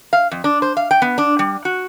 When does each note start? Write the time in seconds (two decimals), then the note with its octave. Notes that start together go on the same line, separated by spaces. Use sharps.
0.13 F5
0.32 F2
0.44 D4
0.62 C5
0.77 F5
0.91 G5
1.02 B3
1.18 D4
1.39 G3
1.65 F#4